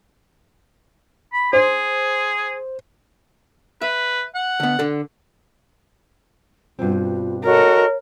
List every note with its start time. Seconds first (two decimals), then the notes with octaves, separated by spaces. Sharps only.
1.33 B5
1.53 G#4 C5
3.81 B4 E5
4.35 F#5
4.60 D3 B3
4.79 D3 A4
6.79 G2 B2 C4 F4
7.45 F#4 A4 A#4 C#5 D#5